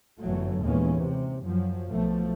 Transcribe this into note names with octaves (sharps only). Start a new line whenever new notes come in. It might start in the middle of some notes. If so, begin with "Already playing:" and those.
G1 F#2 E3 F#3 A3
D#2 A#2 E3 G#3 B3 C#4
C3
F#2 F3 F#3
B1 B2 F3 A3